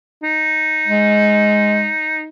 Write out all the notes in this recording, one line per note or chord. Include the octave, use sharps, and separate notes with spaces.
D#4
G#3